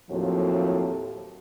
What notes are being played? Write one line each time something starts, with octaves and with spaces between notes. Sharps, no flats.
D#2 A2 F3 F#3 C4 A4